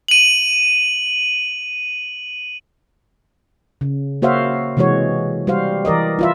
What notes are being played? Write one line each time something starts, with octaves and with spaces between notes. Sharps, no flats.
D#7 F#7
C#3
A#3 F#4 C5 C#5 E5 F5
C3 E3 G#3 F#4 C#5
G3 F#4 C5 F5
E3 A#4 D5 D#5
E4 F4 E5